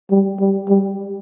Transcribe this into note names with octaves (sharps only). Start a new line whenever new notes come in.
G3
G3
G3